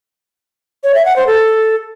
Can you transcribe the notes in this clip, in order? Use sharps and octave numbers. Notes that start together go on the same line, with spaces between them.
C#5
E5
F#5
C5
A4